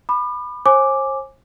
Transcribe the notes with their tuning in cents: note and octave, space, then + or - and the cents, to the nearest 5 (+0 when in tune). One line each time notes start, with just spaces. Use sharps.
B5 +0 D6 +45
C5 +40 G#5 +0 D6 +0